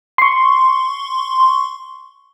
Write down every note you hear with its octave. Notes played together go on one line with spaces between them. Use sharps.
C6 C#6